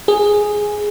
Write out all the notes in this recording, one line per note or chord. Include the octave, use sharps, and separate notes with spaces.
G#4